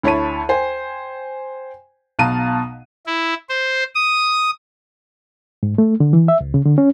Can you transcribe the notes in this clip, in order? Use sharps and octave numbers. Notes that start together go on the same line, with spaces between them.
D2 E4 C#5 A5 B5 D#7
C5 G5 G#5
B1 B2 F5 A5 A#5 D#7
E4
C5
D#6
G#2
A3
D3
E3
E5
C#2
C#3
D3
C#4